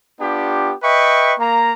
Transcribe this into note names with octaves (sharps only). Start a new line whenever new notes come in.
B3 D4 F4 G4
B4 D#5 E5 G5 C#6
A#3 A#5